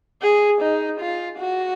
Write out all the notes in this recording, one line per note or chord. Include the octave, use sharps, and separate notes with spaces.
G#4
D#4
F4
F#4